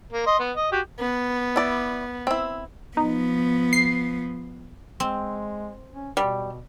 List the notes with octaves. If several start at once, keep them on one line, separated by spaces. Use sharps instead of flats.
A#3
D#5 C6
B3
D#5
F#4 G4
B3
E4 D5
C4 E4
F3 B3 D#4
C7
G#3 C4
C#4
B2 G3